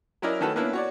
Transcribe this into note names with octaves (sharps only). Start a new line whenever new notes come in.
F#3 C#4 E4 A#4 D5 D#5
D#3 A3 C#4 F#4 A4 B4
A#3 B3 C#4 D4 E4
F#4 C#5 D5